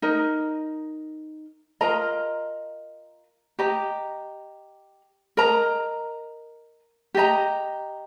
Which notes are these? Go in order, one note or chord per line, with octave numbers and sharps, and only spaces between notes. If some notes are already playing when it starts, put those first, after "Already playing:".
D#4 A#4 D#5
F4 A#4 D#5 A#5
G4 D#5 A#5
A#4 D#5 A#5
G4 D#5 A#5